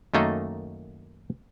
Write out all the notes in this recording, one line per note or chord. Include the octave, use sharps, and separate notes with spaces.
F#2 D#3 A3 A#3 A4 D#5